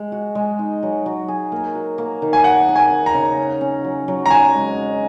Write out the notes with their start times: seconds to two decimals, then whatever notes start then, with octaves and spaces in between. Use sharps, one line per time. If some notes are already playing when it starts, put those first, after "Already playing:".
Already playing: G#3
0.12 F#4
0.35 G#3
0.59 D#4
0.83 F#3
1.06 F#3
1.28 G#4
1.52 A#3
1.75 F#4
1.98 A#3
2.22 D#3
2.33 G#5
2.44 G#4 F#5
2.69 G#4
2.76 G#5
2.91 D#4
3.06 A#5
3.14 C#3
3.37 C#4
3.61 C#4
3.84 F#3
4.08 F#3
4.26 A#5
4.30 F#4 G#5
4.55 G#3
4.77 G#3